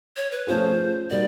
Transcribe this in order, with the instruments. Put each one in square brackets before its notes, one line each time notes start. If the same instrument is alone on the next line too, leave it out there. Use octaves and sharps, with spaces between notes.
[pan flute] C#5
B4
[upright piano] F3 A3 C#4 F4 G#4 [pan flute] C5
[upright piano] G3 A#3 D#4 F#4 [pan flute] D5